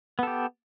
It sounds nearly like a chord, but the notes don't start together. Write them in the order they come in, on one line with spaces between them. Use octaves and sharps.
B3 A4 G4